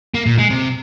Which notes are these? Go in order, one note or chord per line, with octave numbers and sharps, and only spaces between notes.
A#3
A#2
G#3
C3